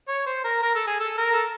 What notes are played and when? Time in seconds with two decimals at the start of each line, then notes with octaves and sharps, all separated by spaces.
0.08 C#5
0.26 C5
0.44 A#4
0.62 A#4
0.75 A4
0.87 G#4
1.00 A4
1.18 A#4
1.33 A4